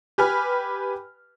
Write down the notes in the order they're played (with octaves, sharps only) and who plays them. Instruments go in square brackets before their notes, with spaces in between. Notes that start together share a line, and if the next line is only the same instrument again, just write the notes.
[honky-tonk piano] G4 B4 G#5 F6